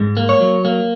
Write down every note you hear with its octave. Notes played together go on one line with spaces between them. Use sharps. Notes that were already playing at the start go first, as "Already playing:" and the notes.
Already playing: G#2 G#3
A#3
C#5
F#3
A#3